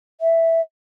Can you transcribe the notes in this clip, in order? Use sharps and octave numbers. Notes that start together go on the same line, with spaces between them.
E5